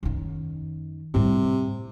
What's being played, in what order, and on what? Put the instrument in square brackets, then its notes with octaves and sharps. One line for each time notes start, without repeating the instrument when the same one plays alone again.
[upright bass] F#2 D#3
[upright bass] A2 G3 [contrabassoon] C3